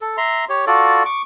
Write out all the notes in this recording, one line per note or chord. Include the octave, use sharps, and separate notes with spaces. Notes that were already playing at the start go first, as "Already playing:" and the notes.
A4
E5 A#5 C6
G4 C#5
F4 F#4 A4 D5
C#6 D6